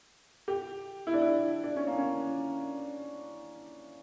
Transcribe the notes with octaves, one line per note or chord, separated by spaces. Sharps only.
G4
E4
D4
E4
D4
C#4
A#3
C#4